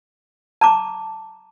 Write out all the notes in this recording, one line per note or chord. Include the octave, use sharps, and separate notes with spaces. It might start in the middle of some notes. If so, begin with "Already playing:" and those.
A5 A#5 D6